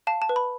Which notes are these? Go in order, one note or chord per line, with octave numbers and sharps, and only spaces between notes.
F5 A5
A5
B4
B5